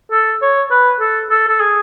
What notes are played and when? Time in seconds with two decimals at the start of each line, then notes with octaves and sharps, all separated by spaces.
0.12 A4
0.42 C#5
0.71 B4
1.00 A4
1.30 A4
1.48 A4
1.60 G#4